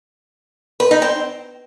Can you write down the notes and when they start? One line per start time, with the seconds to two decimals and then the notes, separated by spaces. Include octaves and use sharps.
0.80 B4
0.91 D#4
1.02 C4